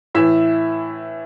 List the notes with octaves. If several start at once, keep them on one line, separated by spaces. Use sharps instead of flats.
A2 E3 E4 E5